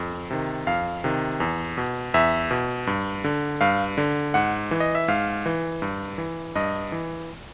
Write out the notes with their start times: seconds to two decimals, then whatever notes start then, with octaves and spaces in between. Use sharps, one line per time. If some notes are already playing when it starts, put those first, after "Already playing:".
Already playing: F2
0.30 C3 D#3
0.67 F2 F5
1.04 C3 D#3
1.40 E2
1.78 B2
2.14 E2 E5
2.51 B2
2.87 G2
3.24 D3
3.61 G2 F5
3.98 D3
4.34 G#2 F#5
4.71 E3
4.80 D#5
4.95 E5
5.08 G#2 F5
5.46 E3
5.82 G2
6.18 E3
6.55 G2 D#5
6.92 E3